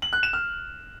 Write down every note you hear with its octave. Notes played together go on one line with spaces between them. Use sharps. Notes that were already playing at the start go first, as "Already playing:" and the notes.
F#7
F#6
E7
F6